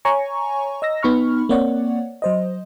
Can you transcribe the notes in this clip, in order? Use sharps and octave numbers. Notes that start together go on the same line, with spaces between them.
C#5 G#5 A#5 C#6
D#5 E6 A#6
B3 D#4 B5 C#6 F6
A#3 C4 C#5 D5 F#5
F#3 C5 D#5